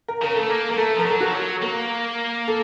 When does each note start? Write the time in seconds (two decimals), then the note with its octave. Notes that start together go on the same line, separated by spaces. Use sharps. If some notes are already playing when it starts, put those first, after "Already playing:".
0.08 A#4
0.22 C#3 A#4
0.35 A3 A4
0.50 A#3
0.70 A#3 A#4
0.77 A3 A4
0.96 F3 A#4
1.06 F#3 A4
1.20 F#4
1.27 F3
1.35 F#3
1.62 A#3 A#4
2.48 A4